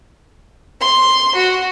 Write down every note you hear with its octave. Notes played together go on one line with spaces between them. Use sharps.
C6
F#4